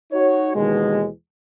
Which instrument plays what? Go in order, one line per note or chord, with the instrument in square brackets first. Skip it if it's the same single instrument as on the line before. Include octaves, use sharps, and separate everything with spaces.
[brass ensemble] D#4 F#4 C#5
D#2 B2 D#3 E3 G#3